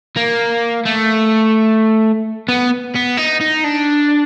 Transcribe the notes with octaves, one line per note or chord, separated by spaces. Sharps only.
A#3
A3
B3
B3
D#4
D#4
D4